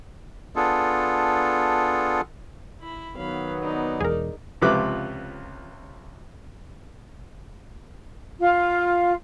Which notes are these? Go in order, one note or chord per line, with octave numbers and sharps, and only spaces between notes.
B3 D4 F4 G#4 A4
E4 B5
D#3 F#3 B3 F5 B5
D#4 D5
E1 E2 G#4 A#4
C#2 C3 F3 B4 D6 F#6
F4 F5